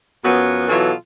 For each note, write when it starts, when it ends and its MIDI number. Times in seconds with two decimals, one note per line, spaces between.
0.23 0.66 42
0.23 0.66 53
0.23 0.66 54
0.23 0.66 59
0.68 0.91 47
0.68 0.91 52
0.68 0.91 54
0.68 0.91 65
0.68 0.91 69